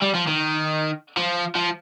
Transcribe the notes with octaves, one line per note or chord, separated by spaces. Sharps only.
G3
F3
D#3
F3
F3